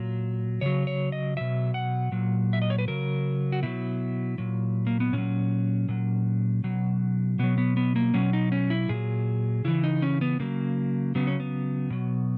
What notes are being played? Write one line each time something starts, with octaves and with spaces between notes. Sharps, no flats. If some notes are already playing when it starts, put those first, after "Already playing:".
Already playing: A#2 F#3
C#3 F#3 C#5
C#5
D#5
B2 F#3 E5
F#5
A#2 F#3
E5
D#5
C#5
B4
C#3 F#3 A#4
F#4
B2 F#3 E4
A#2 F#3
A#3
B3
A#2 F#3 C#4
A#2 F#3
B2 F#3
B2 F#3 B3
B3
B3
A#3
B2 F#3 C#4
D#4
C#4
E4
A#2 F#3 G#4
C#3 E3 E4
D#4
C#4
B3
C#3 F#3 A#3
C#3 F#3 B3
C#4
B3
B2 F#3